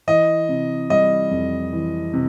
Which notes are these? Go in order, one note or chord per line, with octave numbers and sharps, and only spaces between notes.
E3 D#5
C3
G3 D#5
F2
E3
C3